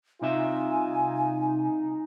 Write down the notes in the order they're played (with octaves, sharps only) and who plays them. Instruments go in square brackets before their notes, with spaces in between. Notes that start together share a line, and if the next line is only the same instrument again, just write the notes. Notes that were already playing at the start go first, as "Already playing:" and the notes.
[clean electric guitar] C2 C3 E5 [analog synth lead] D#4 [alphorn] F4 [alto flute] G#5